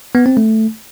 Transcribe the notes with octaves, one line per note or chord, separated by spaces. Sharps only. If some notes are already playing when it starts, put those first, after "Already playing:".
B3
C4
A3